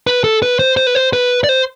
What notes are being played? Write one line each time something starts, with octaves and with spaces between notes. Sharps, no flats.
B4
A4
B4
C5
C5
B4
C5
B4
D5
C5